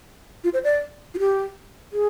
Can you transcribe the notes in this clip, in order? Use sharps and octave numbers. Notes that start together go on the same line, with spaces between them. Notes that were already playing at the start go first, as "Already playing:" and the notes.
F4
C5
D5
F4
G4
G#4